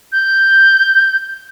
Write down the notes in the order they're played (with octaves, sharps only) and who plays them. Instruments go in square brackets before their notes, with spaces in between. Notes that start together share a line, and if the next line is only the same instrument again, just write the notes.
[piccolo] G6